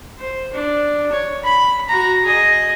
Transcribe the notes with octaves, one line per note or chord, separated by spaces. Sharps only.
C5
D4
C#5
B5
F#4 A#5
G#4 D#5